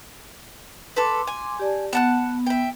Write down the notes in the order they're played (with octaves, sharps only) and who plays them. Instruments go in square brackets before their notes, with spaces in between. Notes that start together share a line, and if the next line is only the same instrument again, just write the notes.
[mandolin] A4 B4 [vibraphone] C6 D6
[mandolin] G#5
[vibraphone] G4 D5 A5
[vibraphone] B3 [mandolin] F#5 A5 F#6
[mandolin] E5 G5